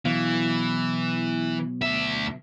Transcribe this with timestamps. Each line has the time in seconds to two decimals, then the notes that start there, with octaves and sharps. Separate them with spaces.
0.05 B1 B2 E3 F5
1.82 D2 E5